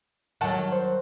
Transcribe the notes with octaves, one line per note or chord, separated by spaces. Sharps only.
D#3 F#3 F#5 A5
C5